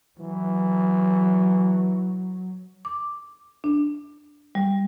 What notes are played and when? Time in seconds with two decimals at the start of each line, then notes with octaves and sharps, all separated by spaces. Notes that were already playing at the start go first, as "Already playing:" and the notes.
0.19 E3 F#3
2.85 D6
3.64 D4
4.55 G3